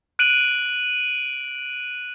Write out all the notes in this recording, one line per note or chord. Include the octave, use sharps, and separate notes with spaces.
F#6 D7 D#7 F#7